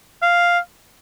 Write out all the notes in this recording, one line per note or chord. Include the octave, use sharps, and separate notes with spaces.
F5